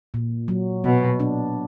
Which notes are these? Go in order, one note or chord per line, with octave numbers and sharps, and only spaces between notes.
A#2
F#3
B2 B3
D4